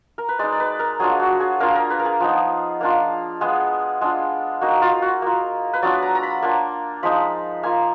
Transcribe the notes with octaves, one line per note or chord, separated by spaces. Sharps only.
A#4
B4
G#3 D#4 D5
D5
B4
A#4
F#3 D4 F4 G#4
F#4
G#4
A#3 D4 F4 A#4
A#4
B4
A#4
G#4
F3 B3 D#4
A#3 D4 F4
G#3 B3 F4 G#4
G#3 D4 F4
A#3 D#4 F#4
F4
F#4
A#3 F4
B4
F#3 B3 D4 F4 D5
A#5
A#5
B5
A#3 D4 F4
F3 G#3 D#4 B5
A#3 F4 G#5